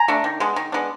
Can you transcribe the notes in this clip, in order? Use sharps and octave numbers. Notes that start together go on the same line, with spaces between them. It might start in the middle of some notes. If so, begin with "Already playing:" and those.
Already playing: G#5 A#5
A3 D4
D#3
G#3 B3 D4
D#3
G#3 B3 D4